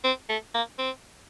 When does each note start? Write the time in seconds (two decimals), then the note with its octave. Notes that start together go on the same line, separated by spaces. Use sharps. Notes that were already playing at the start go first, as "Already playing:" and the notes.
0.04 C4
0.29 A3
0.54 A#3
0.79 C4